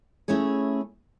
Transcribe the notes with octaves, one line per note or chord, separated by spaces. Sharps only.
A3 C#4 E4 G#4 C#5